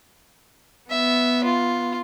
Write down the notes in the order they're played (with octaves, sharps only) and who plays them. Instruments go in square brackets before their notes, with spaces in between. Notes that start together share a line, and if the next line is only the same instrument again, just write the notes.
[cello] B3 [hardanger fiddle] E5
[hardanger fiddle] F4